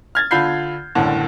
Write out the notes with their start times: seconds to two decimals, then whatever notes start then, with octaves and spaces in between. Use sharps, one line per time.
0.15 F6 G#6 A6
0.31 D3 F4 B5 G6 C7
0.95 F#1 C2 A2 D3